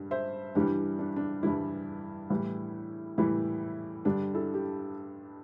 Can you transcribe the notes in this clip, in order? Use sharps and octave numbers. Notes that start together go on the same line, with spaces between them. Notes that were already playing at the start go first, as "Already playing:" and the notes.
Already playing: G2 G3
C5 E5
G2 E3 G3 D4 G4
D4
D4
G2 E3 G3 E4
A2 E3 G3
A2 E3 G3 E4
G2 D3 G3 D4 G4
E4 A4
G4